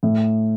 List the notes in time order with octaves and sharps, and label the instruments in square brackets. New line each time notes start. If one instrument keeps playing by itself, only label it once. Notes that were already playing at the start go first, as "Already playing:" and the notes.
[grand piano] A2